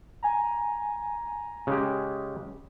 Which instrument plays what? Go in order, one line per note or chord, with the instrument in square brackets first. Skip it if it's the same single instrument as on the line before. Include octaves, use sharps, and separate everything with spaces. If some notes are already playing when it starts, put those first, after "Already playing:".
[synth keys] G#5 A#5
[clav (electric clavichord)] C#3 G#3 G4